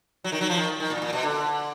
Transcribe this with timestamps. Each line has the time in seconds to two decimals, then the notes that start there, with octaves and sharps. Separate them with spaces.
0.24 F#3
0.32 D#3
0.41 F#3
0.50 F3
0.57 D#3
0.80 D#3
0.90 A#2
1.02 A#2
1.13 B2
1.23 D3